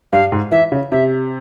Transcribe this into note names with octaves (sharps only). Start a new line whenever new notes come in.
G2 F5
G#2
E3 E5
C#3
C3 E5